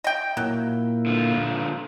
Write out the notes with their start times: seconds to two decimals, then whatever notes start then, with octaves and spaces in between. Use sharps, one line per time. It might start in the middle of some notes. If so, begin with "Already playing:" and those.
0.04 D#5 G5
0.37 A#2 F#3 A#3 E4
1.06 D3 F4